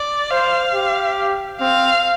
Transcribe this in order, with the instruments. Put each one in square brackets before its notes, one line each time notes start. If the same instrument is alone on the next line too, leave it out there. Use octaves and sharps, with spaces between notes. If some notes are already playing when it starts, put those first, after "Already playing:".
Already playing: [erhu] D5
[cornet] C5 [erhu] F5
[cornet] G4
[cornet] C4 [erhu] F5